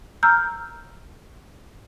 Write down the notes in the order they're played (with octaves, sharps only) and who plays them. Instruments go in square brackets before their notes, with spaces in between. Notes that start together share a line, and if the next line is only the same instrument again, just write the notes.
[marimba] A#5 E6 F6 G6